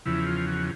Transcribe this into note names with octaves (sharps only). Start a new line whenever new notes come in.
E2 C#3 F3 E4
F4
F#4